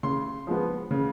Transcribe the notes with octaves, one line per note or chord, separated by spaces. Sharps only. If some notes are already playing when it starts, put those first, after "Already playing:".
C#3 C6
F3 G#3 B3
C#3